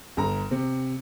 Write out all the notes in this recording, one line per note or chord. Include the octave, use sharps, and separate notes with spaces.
G1 A#5
C3